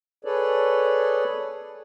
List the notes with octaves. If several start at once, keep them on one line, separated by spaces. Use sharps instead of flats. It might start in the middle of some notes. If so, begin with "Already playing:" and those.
G#4 A4 B4 C#5 D5